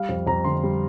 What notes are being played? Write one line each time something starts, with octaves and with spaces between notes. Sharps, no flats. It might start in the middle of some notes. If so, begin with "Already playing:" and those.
Already playing: G3 F5
F2
F2 A#5
D3 C6
G3